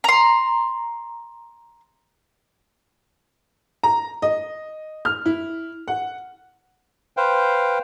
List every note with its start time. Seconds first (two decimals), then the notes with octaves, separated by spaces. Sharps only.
0.04 A#5 C6
3.83 A#5
4.22 D#5
5.05 F6
5.26 E4
5.88 F#5
7.17 B4 C5 F5 G5